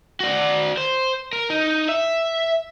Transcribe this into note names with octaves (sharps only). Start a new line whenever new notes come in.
F#4 D5
C5
A#4
D#4
E5